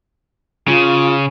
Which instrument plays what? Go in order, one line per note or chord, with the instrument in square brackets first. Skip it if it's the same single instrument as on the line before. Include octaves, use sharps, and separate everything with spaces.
[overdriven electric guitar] C#3 [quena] F4